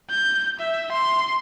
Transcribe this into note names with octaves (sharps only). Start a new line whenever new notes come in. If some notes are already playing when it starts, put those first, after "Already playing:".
G6
E5
C6